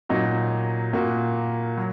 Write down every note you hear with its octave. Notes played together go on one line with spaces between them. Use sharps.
A#2 F#3 D#4 F#4
A#2 A#3 F#4
F#3